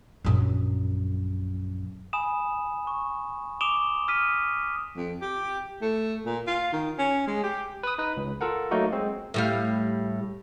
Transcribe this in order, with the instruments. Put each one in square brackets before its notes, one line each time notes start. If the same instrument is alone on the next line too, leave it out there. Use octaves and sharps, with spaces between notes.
[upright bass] A#1 F#2
[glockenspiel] G#5 B5 D#6 E7
C#6
D6 D#6 D7 E7 F7 G7
D#6 F6 B6 D#7
[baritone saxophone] F2
G4
A3
A#2
F4
D#3
C#4
G#3
G4
[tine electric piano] B4 D#6
D#4 B4
C#2
F4 A4 A#4 F#5
F#3 A3 A#3 D#4 F#4
G#3 C4
[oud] A2 G3 F5